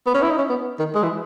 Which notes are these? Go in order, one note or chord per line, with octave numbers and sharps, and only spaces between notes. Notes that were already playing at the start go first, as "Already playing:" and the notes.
B3
C#4
E4
D#4
C#4
B3
D#3
G#3
E3